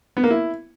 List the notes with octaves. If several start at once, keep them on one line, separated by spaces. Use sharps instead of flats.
B3
A#3
E4